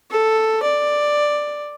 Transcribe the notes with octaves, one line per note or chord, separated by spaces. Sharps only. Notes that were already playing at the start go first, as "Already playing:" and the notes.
A4
D5